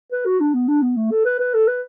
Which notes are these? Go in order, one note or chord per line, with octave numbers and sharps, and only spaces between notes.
B4
F#4
D4
B3
D4
B3
A3
A4
B4
B4
A4
B4